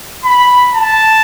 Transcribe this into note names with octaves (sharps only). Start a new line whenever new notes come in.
B5
A5